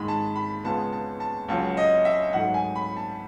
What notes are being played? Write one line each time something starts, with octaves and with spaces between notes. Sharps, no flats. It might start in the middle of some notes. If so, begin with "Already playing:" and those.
Already playing: G#2 D#3 G#3 B5
A5
B5
C#2 C#3 G#3 B3 A5
A5
A5
C#2 C#3 F#3 A5
D#5
E5
G#2 F#3 A3 F#5
G#5
B5
A5